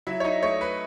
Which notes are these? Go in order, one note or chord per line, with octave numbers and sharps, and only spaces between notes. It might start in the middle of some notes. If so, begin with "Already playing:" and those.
F#3 E4 E5
C#5
D#4 D#5
A3 C#5
B4